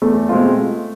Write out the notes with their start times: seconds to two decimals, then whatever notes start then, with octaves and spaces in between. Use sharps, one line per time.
0.02 E2 A3
0.29 B2 G#3 C4 F4